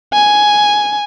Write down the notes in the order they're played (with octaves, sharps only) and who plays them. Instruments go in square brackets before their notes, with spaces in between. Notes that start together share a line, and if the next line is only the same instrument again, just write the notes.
[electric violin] G#5